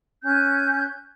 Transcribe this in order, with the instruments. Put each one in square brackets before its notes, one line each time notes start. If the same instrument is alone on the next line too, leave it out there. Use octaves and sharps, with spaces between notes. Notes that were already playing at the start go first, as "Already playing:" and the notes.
[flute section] C#4 F#6 G6